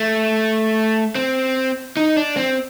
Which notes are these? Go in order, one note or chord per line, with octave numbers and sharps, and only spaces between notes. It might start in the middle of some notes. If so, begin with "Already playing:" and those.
Already playing: A3
C4
D#4
D4
C4